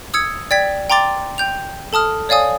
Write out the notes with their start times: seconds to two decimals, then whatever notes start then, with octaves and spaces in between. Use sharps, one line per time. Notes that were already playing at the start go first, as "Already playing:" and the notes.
0.14 D#6 E6 G#6 C#7
0.51 D5 G5 G#6 B6
0.90 G5 A#5 C6 D6 A6
1.38 G5 G6 F7
1.93 A4 A5 D#6 F6
2.29 C#5 D5 F5 G#5 D#6